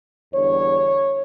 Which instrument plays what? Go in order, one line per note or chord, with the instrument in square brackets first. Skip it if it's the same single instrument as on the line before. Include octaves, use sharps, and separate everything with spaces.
[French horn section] E2 D3 G3 C#5